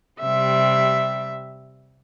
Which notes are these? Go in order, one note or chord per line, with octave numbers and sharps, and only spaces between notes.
C3 G3 E5